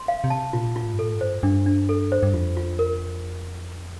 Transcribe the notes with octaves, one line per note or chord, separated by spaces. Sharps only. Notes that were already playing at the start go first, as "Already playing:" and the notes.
Already playing: C6
F5
C3
A5
A#2 F4
F4
A2
G2
A2 A4
G2
C5
G2 D4
D4
A4
C5
G2
F2 F4
F4
A#4